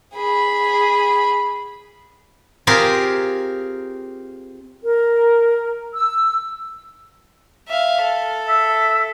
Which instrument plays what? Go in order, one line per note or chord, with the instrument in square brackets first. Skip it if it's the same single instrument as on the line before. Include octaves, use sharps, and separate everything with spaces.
[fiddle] G#4 B5
[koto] C4 F4 G4 G#4 A#4
[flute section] A#4
E6
[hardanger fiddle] E5 F5
A4
[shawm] E5